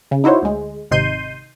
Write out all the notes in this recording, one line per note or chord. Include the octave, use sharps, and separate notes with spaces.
C#3
D#4 E4 F#4 C5 C#5
D2 G#3
G#1 C3 D#4 C6 G6 D#7